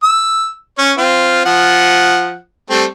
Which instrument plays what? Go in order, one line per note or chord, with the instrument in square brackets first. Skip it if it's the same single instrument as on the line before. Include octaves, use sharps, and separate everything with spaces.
[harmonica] E6
C#4 C#5
C4 F4
F3 F#5
G3 A3 C4